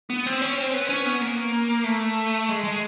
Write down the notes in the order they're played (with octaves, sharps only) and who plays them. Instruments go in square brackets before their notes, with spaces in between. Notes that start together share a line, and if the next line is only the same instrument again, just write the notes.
[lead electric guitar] B3
C4
C#4
C4
B3
C#4
B3
A#3
A3
G#3
G#3